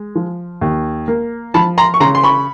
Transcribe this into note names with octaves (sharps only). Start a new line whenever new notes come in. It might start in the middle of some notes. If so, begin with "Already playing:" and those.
Already playing: G#3
F3
D#2
A#3
F3 A5 B5
A#5 C6
C#6
C#3 A#5 C6
C6
B5 C#6